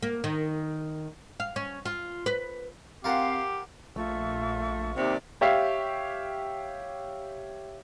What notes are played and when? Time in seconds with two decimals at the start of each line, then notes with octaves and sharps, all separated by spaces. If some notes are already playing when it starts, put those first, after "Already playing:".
0.03 A#3
0.24 D#3
1.40 F5
1.56 C#4
1.85 F4
2.26 B4
3.04 C4 F4 G4 A#4 F5 F#5
3.96 A#1 A3 F4 E5 C#6
4.96 D#2 C3 D5
5.41 G4 C#5 E5 F5